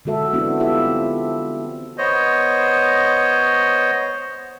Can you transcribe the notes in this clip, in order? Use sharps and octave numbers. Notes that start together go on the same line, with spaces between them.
D3 G#3 F#4 A4 E5
B3 C4 D4 E4 F#4
E4 F4 G4 A4 E5
C4
B3 C5 C#5 D#5